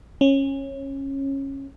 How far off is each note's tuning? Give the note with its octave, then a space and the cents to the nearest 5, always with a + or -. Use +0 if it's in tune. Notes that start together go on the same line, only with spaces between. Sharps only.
C#4 -20